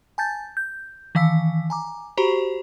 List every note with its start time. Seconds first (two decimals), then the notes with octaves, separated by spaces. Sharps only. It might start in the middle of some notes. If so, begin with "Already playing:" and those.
0.18 G#5 A5 G6 A6
0.57 G6
1.15 D#3 E3 F5 E6 B6
1.70 G#5 A#5 D6
2.17 F#4 G4 C5 A#5 B5 C#6